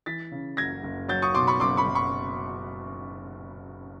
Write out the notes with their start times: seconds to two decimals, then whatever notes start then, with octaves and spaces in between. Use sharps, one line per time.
0.06 E3 A6 B6
0.32 C#3
0.57 F#1 G#6 A#6
0.83 F#1
1.08 F#3 G6 A6
1.22 C#6 D#6
1.34 B2 C6 D6
1.47 B5 C#6
1.60 F#1 C6 D6
1.77 B5 C#6
1.86 F#1
1.95 B5 C#6